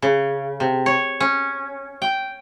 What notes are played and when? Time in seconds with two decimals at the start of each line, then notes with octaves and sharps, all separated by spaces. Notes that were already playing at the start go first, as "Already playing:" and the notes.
0.02 C#3
0.60 C3
0.86 C#5
1.20 C#4
2.02 G5